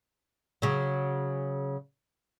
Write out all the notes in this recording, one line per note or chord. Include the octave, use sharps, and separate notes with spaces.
C#3 F#3